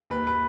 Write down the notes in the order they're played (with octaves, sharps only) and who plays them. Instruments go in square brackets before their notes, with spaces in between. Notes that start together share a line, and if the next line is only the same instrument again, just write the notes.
[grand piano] D#2 B4
B4